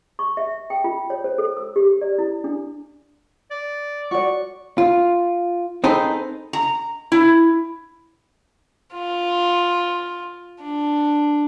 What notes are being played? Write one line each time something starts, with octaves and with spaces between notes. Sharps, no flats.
C#6
E5
G5
F4
C#5
C5
A4
E6
G4
D5
E4
D4
D5
F#4 D5 C#6
F4
C4 D#4 G#4 A4 B4 C5
A#5
E4
F4
D4